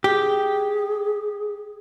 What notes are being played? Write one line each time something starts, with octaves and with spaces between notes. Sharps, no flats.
G4 G#4